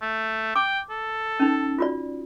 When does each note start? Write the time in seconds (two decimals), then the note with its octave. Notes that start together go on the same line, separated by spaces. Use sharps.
0.02 A3
0.56 G5 D6
0.90 A4
1.40 C#4 D#4
1.78 F4 F#4 D5